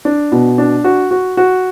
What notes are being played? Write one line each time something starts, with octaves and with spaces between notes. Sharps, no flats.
D4
B2
D4
F#4
F#4
F#4